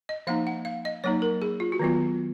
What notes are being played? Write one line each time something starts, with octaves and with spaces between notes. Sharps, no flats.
D#5
F3 A#3 D#4 F5
F#5
F5
D#5
F#3 A#3 D#4 C#5
A#4
G#4
F4
F#4
D#3 F#3 B3 F4